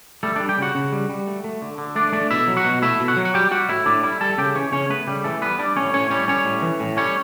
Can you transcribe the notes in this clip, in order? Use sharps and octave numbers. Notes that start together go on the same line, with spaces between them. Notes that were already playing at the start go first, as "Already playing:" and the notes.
G3 A3 A4
G3 D4 D5
G4 G5
C#3 F#4 F#5
C#3
G3
G3
A3
A3
D3
D3
A3 D4 D5
A3 D4 D5
B2 E4 E5
F#3
F#4 F#5
B2
A3 E4 E5
B2
F#4 F#5
F#3
F#5
G3 G4 G5
G3 F#4 F#5
A2 E4 E5
A2 D4 D5
G3 E4 E5
G3 A4 A5
C#3 G4 G5
E3 C#4 C#5
C#3 C#4 C#5
A3 B3 B4
C#3 G3 G4
E3 A3 A4
G3 B3 B4
G3 D4 D5
A2 C#4 C#5
A2 C#4 C#5
G3 C#4 C#5
G3 C#4 C#5
A2
E3
A2
G3 C#4 C#5